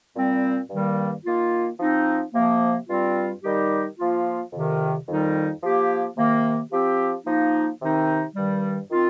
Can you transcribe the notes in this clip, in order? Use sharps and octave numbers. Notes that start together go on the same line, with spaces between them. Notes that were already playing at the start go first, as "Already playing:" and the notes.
A#2 G3 C4
G2 D#3 G3 A#3
D#3 A#3 F4
F3 C4 D#4
C3 F3 A#3
G2 G3 C4 F4
D#3 G3 D#4 G4
F3 A#3 F4
F2 C3 D#3
F2 D#3 G3 D#4
F3 A#3 G4
C3 D#3 A#3
F3 C4 G4
F3 A#3 D#4
C3 D#3 C4 D#4
G2 D#3 G3
D#3 C4 F4